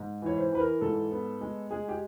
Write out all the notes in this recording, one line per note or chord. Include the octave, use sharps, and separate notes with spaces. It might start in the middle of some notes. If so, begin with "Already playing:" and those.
Already playing: G#2
E3 C#5
C5
E3 B4
A#4
G#2 A4
B3
G#3
G#3 G#4
G4